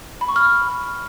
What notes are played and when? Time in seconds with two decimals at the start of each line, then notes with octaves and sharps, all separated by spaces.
0.21 B5
0.29 C#6
0.36 F6